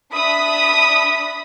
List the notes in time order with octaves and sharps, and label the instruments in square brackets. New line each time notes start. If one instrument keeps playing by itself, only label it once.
[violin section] D4 E5 B5 D#6 B6